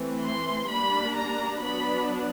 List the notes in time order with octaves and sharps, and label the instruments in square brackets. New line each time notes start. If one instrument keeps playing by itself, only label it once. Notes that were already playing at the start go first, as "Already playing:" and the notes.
Already playing: [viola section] E3 A3 C4
C6
G3 A#3 D4 B5
A#5
F#3 B3 D4 B5